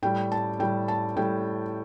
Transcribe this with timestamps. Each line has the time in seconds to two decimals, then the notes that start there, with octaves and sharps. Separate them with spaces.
0.02 A2 G3 G5
0.32 A5
0.59 A2 G3 G5
0.88 A5
1.16 A2 G3 G5